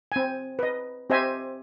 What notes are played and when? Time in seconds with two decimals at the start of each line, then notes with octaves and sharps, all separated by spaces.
0.12 C4 G#5
0.59 B4 D#5
1.10 C4 G4 C5 D#5 E5 G#5